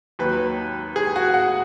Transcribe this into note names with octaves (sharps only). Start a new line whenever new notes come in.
D#2 D#3 F#3 B4
G#4
F#4
F#5